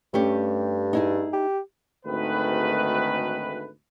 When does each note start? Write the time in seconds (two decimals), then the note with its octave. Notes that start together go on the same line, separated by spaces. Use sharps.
0.14 G2 A3 C#4 G4
0.93 D#4 E4 G#4
1.33 G4
2.06 G#1 D2 G#2 D#3 A3 B4